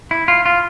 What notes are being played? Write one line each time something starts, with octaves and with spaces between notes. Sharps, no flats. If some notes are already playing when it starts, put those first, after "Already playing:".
E4
F4
F4